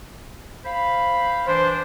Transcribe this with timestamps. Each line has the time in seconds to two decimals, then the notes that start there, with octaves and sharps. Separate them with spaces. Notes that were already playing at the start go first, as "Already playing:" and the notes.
0.65 C5 F5 B5
1.48 E3 D4 C5